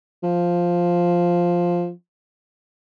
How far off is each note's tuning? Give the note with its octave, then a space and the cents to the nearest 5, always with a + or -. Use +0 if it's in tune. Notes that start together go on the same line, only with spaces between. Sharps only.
F3 +0